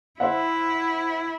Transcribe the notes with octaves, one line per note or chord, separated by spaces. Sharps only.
E4 C5 E5 F#5